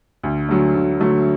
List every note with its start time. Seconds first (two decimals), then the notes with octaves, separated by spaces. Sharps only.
0.23 D2
0.49 D3 F#3 A3
0.75 D2
1.00 D3 F#3 A3